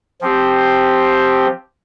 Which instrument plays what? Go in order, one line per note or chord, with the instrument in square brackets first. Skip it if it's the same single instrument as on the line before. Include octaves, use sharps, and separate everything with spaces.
[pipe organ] F3 C4 G4